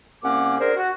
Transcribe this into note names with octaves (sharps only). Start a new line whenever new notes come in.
C2 A#3 C#4 F#5 D6
D4 G#4 A#4 C5
F#4